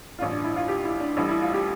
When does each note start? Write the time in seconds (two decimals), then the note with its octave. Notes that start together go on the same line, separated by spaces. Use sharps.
0.19 A1 G2 D3 F4
0.31 D4
0.43 E4
0.56 F4
0.68 G4
0.85 E4
1.00 D4
1.17 A1 A2 G3 E4
1.29 E4
1.41 F4
1.54 G4